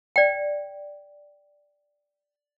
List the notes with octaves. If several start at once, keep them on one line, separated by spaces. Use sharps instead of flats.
D5 G5